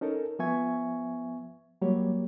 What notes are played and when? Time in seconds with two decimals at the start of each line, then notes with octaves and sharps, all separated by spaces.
0.01 C#4 D#4 A4 A#4
0.39 F3 B3 E5 G#5 C#6 G#6
1.82 F#3 G3 A#3 G4 C#5